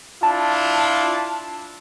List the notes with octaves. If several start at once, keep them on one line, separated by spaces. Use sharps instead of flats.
D4 E4 F4 A5